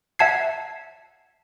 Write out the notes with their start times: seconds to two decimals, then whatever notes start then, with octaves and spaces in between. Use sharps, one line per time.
0.19 E5 F#5 A5 G#6 C7